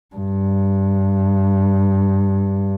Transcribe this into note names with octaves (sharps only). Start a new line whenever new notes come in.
G2